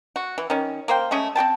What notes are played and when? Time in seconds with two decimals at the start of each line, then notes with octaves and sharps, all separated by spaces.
0.16 F#4
0.38 E3
0.50 D#3 C#4
0.88 A#3 C5 F5 G5
1.11 G#3 A3 C#4 D#5
1.35 C4 G4 G5 A5